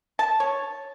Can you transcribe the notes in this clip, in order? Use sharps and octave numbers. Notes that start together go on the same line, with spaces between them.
A5
C#5